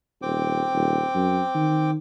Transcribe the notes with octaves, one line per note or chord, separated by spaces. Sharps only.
D#1 C4 G5 D6
D#1
F#2
D#3